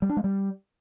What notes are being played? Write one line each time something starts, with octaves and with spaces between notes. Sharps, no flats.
G3
D4
G#3
G3